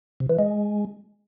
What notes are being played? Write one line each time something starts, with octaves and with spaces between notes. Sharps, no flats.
C3
E3
G#3